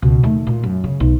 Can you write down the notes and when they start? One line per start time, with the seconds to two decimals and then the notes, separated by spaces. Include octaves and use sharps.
0.02 C#2 B2
0.23 D#2 A3
0.47 A#2
0.63 F#2
0.84 C#3
1.00 B1